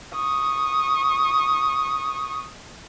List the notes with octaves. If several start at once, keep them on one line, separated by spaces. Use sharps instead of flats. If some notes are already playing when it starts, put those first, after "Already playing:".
C#6 D#6